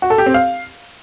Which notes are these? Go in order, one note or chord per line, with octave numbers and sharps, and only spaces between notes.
F#4
A4
G4
C4
F5